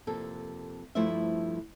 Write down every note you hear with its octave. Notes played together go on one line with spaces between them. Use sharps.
F2 C3 A#3 A4
G2 F3 A3 E4 C5 E5